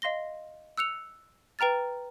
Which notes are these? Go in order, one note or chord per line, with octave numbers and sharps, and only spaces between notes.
D#5 F5 C6 A#6 G7
E6 F#6 C#7 F7
B4 G5 A#5 F6 A6